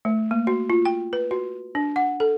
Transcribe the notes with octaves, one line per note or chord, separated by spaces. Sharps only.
A3
A#3
F#4
F4
G5
B4
F#4
D4
F#5
A4